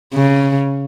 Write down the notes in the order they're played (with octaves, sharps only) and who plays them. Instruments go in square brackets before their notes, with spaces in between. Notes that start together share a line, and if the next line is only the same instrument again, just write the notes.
[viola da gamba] C#3